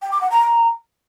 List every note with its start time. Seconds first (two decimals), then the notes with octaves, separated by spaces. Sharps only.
0.02 G5
0.11 D6
0.21 F#5
0.30 A#5